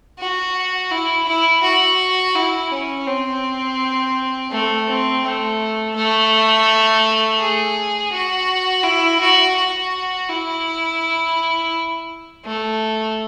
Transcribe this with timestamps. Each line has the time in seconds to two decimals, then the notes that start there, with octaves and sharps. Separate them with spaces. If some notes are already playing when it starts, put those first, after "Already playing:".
0.19 F#4
0.91 E4
1.28 E4
1.63 F#4
2.35 E4
2.71 C#4
3.07 C4
4.51 A3
4.87 C4
5.23 A3
5.96 A3
7.40 G#4
8.12 F#4
8.84 E4
9.20 F#4
9.56 F#4
10.29 E4
12.45 A3